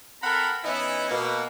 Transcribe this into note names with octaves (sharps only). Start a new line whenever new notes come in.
C4 A4 A#4 F#5 A#5 B5
E3 B3 C#4 D#4 E4
B2 A#3